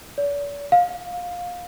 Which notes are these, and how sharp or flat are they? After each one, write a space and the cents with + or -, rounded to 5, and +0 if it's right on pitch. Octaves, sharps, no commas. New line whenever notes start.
D5 -45
F5 +20